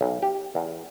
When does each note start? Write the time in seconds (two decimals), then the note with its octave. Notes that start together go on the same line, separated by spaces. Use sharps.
0.01 B1
0.22 G4
0.55 E2